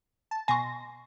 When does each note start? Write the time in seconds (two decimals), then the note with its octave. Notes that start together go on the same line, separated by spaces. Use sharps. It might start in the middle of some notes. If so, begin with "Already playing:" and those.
0.31 A5
0.48 B2 G#5 C6 C#6 A#6